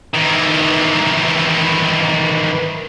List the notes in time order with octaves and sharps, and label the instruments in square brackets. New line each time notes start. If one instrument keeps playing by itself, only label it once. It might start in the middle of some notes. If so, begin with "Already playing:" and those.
[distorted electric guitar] D#3 E3